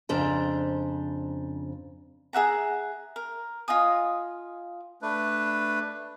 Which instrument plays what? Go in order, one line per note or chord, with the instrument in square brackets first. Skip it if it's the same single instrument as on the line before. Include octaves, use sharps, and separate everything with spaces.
[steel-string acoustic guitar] F2 C#3 D4 C5 A#5
[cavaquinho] G#4 E5 F#5 A#5
A#4
F4 D#5 G#5 D#6
[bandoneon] A3 D4 B4